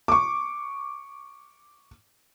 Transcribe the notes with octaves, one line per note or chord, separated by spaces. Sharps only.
C#6 D6